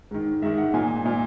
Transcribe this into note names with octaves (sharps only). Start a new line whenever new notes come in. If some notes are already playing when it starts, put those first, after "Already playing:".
G#2 D#3
G#2 D#3 E5
F#5
A#2 G#5
A#2